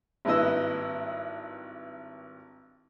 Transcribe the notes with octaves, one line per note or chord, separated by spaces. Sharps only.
G#1 G2 E4 B4 D#5 E6